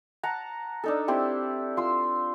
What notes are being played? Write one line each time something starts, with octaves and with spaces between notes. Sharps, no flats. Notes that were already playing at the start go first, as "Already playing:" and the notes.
F#5 A5 A#5
D4 D#4 A4
C4 E4 G4
F4 C6 E6